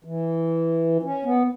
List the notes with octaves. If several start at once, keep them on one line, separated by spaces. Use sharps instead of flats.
E3
C#4
B3